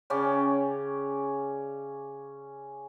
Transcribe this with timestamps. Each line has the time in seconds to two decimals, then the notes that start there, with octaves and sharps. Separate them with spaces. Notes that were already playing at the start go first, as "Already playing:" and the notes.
0.10 C#3 C#4 D5 G5